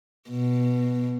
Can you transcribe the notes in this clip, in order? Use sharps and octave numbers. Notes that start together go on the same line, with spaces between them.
B2